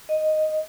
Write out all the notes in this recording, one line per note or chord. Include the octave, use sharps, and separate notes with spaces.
D#5